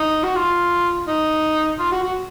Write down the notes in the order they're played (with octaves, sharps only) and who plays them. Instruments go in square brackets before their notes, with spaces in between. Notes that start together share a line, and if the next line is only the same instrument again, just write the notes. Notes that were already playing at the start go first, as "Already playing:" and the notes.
Already playing: [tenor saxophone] D#4
F#4
F4
D#4
F4
F#4
F#4